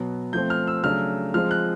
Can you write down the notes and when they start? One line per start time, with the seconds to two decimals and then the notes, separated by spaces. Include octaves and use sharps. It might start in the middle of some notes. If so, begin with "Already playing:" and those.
Already playing: B2 F#3 B3
0.33 F3 A3 C4 G6
0.50 F6
0.67 E6
0.84 C#3 F#3 A3 D4 F6
1.34 F3 G#3 C4 F6
1.51 F#6